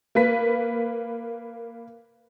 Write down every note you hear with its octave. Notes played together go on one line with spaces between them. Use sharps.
A#3 B4 B6